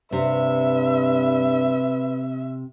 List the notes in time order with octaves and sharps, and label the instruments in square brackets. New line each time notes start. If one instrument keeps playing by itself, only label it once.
[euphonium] G2 [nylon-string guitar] C3 [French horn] B4 [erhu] E5